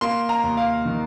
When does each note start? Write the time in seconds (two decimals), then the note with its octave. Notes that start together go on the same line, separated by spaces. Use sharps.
0.01 A#3 C6
0.29 A#5
0.44 D#2
0.57 F5
0.85 D#3